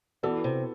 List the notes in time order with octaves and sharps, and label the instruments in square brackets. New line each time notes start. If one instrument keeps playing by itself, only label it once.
[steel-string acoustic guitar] E3 [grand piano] B3 F#4 A4 D5
[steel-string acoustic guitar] C3